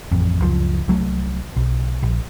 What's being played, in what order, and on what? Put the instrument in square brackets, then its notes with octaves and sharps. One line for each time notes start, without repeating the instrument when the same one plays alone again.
[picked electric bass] A1 F2
C#2 F#2 F3
C2 F#3 A3
B1
A#1